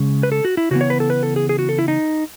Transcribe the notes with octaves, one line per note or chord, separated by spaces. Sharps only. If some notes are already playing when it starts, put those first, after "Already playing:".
Already playing: C#3 G#3 C#4
B4
A4
F#4
E4
C#3 E3 B3 F#4
C#5
B4
A4
B4
A4
G#4
G#4
F#4
A4
E4
D#4